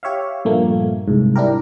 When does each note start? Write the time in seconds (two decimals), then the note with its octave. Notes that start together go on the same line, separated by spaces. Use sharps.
0.03 G4 C#5 E5 F5
0.45 G2 A#2 F3 A3 A#3
1.08 C2 G#2
1.36 D4 E4 G4 A#4